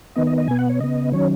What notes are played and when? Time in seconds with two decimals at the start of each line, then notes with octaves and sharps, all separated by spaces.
0.16 D#3 B3 D#5
0.27 D#5
0.38 D#5
0.48 B2 B3 G#5
0.59 F#5
0.69 C#5
0.80 C#3 B3 D#5
1.12 D#3 F#3 C#4 C#5